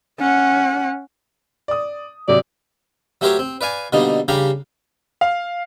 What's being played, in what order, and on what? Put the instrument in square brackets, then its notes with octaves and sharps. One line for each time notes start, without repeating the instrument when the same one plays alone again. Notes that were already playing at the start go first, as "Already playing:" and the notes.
[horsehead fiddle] C#4 F#5
[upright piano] D5 D#6
[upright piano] C3 F#3 [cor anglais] D5
[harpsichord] F#3 A3 G4 A#4 C5 C#5
C4
B4 D5 F5 G#5
B2 D3 G3 A#3 D#4
C#3 G3 D4 G4 F5 A#5
[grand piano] F5